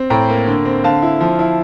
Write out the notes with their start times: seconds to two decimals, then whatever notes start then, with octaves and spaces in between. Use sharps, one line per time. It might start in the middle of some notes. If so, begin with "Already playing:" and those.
Already playing: C4
0.10 A2 G5 A#5
0.29 A#3
0.47 D3
0.65 C4
0.84 D3 F5 A5
1.02 E4
1.20 F3
1.39 E4